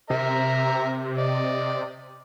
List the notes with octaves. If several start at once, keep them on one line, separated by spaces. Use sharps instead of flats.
C3 A#4 E5 A#5
D5 D#5